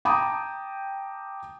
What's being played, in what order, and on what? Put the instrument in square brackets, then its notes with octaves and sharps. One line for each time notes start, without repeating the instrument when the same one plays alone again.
[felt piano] G5 A5 A#5 D6 D#6